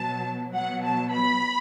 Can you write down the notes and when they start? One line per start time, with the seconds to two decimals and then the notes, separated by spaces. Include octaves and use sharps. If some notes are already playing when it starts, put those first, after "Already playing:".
Already playing: B2 F#3 A5
0.53 B2 F#3 F#5
0.83 A5
1.13 B5